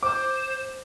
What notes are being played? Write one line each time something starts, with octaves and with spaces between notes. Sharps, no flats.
C5 D6